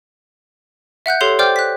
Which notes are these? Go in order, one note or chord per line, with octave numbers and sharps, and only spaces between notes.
E5 F#5 F#6 G6
G4 A4 C#5 C6 C7 F7
C5 D5 G5 D6 F6 G6
F#6 B6